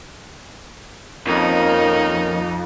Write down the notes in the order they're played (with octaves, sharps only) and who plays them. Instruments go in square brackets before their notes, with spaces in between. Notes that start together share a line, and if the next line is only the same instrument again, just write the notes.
[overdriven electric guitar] F2 [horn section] D#3 A#3 C#4 [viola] D#4